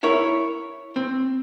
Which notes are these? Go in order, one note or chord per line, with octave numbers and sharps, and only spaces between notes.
E4 A#4 C#5 E5
C4